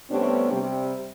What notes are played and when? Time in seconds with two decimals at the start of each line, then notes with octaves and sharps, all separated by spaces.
0.11 C3 G3 A3 B3 C#4 D4
0.52 C3 G3